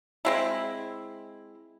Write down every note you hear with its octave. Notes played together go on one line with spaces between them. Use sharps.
G#3 C4 E4